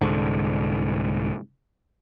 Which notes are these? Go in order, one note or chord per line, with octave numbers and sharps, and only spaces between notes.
C2 G#2 D3